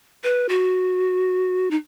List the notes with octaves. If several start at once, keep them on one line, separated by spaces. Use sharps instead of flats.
B4
F#4
D#4